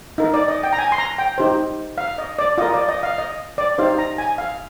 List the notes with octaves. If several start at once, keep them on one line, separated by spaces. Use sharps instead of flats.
D#4 A#4
D5
D#5
G5
A#5
G#5
C6
A#5
G5
D#4 G4 C5
F5
D#5
D5
F4 A#4 D#5
D5
D#5
F5
D#5
D5
D#4 G4 C5 F5
A#5
G#5
F5